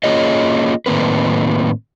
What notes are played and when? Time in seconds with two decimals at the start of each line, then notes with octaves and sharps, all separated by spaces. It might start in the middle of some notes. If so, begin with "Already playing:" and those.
0.04 A#3 C#4 F4 G#4 C#5 D#5
0.86 A2 D#3 A#3 C4 B4